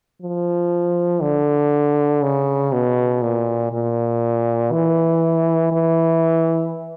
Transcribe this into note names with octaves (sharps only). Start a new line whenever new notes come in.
F3
D3
C#3
B2
A#2
A#2
E3
E3